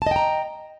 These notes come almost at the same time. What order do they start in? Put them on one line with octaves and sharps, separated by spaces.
A5 D#5 G5 A#5